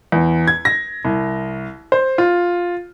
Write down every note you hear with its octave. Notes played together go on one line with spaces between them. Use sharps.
E2
G#6
A#6
C2
C5
F4